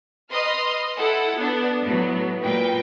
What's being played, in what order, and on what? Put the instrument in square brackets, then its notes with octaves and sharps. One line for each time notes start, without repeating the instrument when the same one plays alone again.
[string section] B4 D#5 C6 D#6 F6
E4 A4 F#5
B3 D4
A2 F#3 B3
A#2 B4 G5